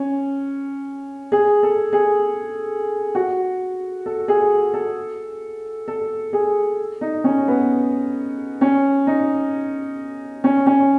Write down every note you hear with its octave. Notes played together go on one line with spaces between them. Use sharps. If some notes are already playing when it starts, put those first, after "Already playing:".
Already playing: C#4
G#4
A4
G#4
F#4
A4
G#4
A4
A4
G#4
D#4
C#4
B3
C#4
D#4
C#4
C#4